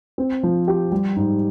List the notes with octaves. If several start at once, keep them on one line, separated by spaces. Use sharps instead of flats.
C4
F3
G4
G3
G#2